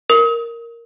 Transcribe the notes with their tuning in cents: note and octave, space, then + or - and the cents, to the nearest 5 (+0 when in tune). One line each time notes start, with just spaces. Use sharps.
A#4 +0 D#6 +40